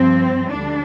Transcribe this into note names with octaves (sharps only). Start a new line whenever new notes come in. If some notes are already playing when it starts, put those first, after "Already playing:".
Already playing: G2 F3 C4
D2 D3 G3 D4